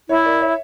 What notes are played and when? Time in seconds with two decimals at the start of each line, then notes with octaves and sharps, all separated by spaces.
0.09 E4 C#5 E5
0.25 A#4 D5
0.41 C#5 E5